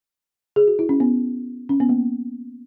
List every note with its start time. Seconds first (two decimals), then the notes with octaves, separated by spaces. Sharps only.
0.56 G#4
0.68 F#4
0.79 E4
0.89 C#4
1.00 B3
1.69 C#4
1.80 B3
1.89 A#3